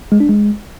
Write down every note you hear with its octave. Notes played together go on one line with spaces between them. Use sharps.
G#3
D4
G#3